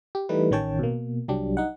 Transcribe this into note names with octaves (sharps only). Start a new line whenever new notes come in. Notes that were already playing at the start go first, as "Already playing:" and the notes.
G4
E3 G3 A3 D#4 B4
A1 D#3 C#4 C#5 G5 A5
B2 A#3
C2 F#3 G3 D4 G4
D#4 F#5